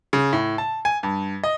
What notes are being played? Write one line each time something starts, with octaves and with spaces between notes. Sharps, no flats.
C#3
A2
A5
G#5
G2
D#5